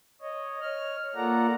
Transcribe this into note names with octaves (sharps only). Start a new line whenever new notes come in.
C#5 D#5
C#5 F6
A#3 F4 A4 D5 F#5 A#5